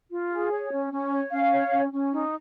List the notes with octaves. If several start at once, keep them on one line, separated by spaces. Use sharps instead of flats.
F4
G#4
C#5
C#4
C#4
C#5
C#4 F5
C#5
C#4
C#4
D#4